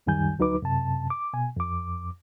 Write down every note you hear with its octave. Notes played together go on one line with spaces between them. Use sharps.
C#2 F#2 D#3 G3 G#5 G6
D2 F#3 D#4 B4 D6
F#2 C3 A5
D6
B2 G#5
F2 D6